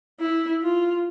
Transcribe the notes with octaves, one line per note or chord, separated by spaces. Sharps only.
E4
F4